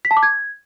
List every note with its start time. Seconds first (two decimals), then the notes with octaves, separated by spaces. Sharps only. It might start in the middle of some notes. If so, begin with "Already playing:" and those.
0.05 B6
0.11 A5
0.17 D6
0.23 G#6